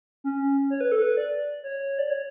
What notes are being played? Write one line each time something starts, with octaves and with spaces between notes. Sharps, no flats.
C#4
C#5
B4
A4
B4
D5
C#5
D5
C#5